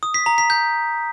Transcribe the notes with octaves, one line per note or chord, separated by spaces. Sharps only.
D#6
B6
A#5
B6
G6